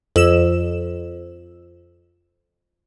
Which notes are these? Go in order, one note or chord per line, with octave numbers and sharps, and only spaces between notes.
F2 E6 E7